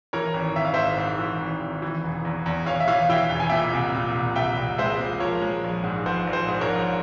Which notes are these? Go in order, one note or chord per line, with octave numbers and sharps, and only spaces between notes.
E3 A#4 C#5
G#1
G#1 E5
F5
G#2 C5 E5
G#2
E3
G#1
G#1
E3
E1
E2
E2
E2 C#5 F5
E5
E3 C#5 F5
E3 E5 G5
E1 G5
G#5
A#2 E5 G5
C2
A#2
C2
C2 E5 G5
C2
G#3 C5 E5
A#2
F3 A#4 C#5
G#3
A#1
G#2
A#1 C5
A#1
C5
G#2
A#4 C#5
A#1